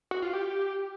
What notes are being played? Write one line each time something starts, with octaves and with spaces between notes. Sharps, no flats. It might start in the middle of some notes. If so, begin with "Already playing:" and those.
F#4
F4
G4